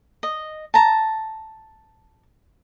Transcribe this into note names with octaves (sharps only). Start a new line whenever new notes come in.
D#5
A5 A#5